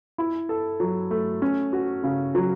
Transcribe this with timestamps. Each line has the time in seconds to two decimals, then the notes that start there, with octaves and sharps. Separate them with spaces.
0.18 E4
0.49 A4
0.80 F#3
1.11 A3
1.42 C#4
1.73 F#4
2.04 C#3
2.35 F#3